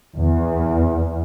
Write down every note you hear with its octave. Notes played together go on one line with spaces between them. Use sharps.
E2